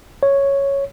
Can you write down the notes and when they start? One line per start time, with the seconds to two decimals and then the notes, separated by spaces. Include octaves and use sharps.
0.23 C#5